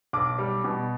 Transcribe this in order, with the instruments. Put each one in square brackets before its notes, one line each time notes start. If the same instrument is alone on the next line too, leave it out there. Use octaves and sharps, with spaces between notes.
[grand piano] B1 D6
G3
B2